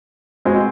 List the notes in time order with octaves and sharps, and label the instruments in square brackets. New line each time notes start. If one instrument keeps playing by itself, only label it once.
[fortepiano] B2 G#3 C4